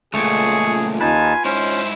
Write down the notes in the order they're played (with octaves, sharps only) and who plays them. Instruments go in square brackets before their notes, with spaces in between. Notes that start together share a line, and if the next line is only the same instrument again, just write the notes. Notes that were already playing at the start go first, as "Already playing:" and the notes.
[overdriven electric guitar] C#2 A#2 [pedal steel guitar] A3 [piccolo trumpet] G#4 [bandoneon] C#6
[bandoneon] D#2 D#4 A5 [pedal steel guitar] F4 B4 [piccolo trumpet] G#5
[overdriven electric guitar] G#2 E4 [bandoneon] C#4 [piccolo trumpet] C5